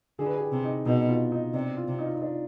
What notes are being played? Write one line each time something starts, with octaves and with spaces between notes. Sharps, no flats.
D3 G#4
B4
G#4
G4
C3
D#4
B2 D#4
F4
D#4
C3 D4
F4
C3
D#4
F4
D#4
D4